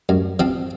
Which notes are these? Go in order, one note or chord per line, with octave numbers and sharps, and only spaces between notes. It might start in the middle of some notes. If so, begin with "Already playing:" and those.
F#2
F3 C4 F4